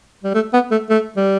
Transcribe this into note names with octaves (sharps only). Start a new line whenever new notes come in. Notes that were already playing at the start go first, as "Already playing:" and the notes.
G3
A3
B3
A3
A3
G3